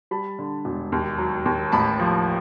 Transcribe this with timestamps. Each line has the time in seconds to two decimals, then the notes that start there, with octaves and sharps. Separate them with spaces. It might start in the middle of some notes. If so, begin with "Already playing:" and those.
0.11 G3 A5 B5
0.39 D3
0.65 E1
0.92 D#2
1.18 F#3
1.45 D#2
1.72 A1 A5 B5
1.99 F3